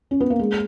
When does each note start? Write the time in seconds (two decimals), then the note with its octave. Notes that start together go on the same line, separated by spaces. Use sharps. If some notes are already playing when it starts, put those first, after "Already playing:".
0.11 C#4
0.20 B3
0.30 A#3
0.39 G#3